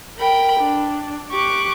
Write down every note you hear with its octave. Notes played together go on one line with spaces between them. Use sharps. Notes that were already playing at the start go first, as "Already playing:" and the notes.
A#4 G5 B5
D4
G4 C#6 D6 F#6